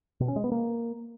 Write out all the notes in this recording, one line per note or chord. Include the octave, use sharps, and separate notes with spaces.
B2
C#4
G#3
B3
A#3